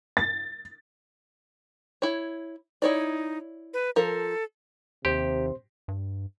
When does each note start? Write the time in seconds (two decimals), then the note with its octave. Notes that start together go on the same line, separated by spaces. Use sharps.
0.17 A6
2.02 E4 C#5
2.82 D#4 E4 C#5 D5
3.74 B4
3.96 F3 A4 A#4
5.05 D#2 C3 G4 C5 C6
5.88 G2